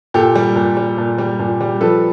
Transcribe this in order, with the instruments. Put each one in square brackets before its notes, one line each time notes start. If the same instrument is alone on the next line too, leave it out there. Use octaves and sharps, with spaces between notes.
[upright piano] A#2 G4 A4
G3
A#2
G3
A#2
G3
A#2
G3
F3 A4 B4